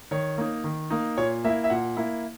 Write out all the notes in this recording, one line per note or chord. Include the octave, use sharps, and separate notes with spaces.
D#3 C#5
A#3 D#4
D#3
A#3 D#4
A#2 C#5
A#3 E4 E5
E5
A#2 F#5
A#3 E4